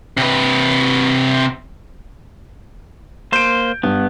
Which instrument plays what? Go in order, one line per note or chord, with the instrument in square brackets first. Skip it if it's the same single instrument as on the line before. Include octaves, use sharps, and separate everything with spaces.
[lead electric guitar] C3 B4
[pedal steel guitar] A#3 C5 [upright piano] G6 D7
[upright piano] G2 [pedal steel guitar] B3